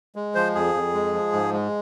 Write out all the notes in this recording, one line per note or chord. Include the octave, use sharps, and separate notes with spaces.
G#3
F3 C5
F2 G#4
F2
G#3
F3
G#2
G#3